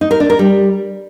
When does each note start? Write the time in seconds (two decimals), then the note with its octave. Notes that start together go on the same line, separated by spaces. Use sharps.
0.01 D#4
0.11 A#4
0.20 D4
0.30 A#4
0.39 G3